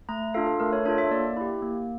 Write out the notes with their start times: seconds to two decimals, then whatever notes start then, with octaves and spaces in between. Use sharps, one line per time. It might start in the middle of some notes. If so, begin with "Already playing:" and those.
0.09 A3 A#5
0.34 D4 F4 A4 F5
0.47 A4
0.60 A3 A#4
0.73 C#5
0.85 D4 F4 A4 C#5
0.98 E5
1.11 A#3 D5
1.37 E4 G4
1.62 A#3